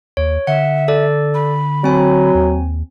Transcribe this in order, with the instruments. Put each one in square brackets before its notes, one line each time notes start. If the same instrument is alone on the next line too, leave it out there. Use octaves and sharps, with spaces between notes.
[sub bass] D#2 [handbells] C#5
[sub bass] D3 [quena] E5 [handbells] F#5
[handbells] A4 D5
[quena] B5
[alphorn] F#3 [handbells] C4 G#5
[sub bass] D#2